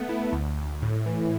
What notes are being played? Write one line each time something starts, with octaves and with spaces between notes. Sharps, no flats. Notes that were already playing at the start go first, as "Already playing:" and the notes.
Already playing: A3 B3
E4
D2
D2
A2
E3